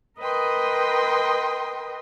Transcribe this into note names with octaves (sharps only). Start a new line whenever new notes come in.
A#4 B4 D#5 G5 C6